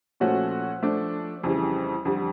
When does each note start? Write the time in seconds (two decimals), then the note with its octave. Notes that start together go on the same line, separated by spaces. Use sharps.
0.20 A#2 F3 A3 C#4 F#4
0.83 F3 A3 D4
1.43 F2 C#3 E3 G3
2.05 F2 D3 G3